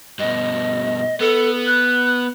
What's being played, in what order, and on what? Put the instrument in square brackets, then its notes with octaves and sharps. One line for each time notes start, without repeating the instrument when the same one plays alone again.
[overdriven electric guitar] G2 B2 [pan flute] D#5
[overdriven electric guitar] B3 [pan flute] A4
[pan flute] F#6